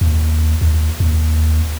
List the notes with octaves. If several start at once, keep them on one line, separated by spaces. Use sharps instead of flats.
D#2
D#2
D#2